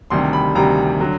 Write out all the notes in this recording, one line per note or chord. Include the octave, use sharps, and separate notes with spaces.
D2 C3 D#3 G3 C6
B5
D2 C3 D#3 G3 A#5
D3 F#3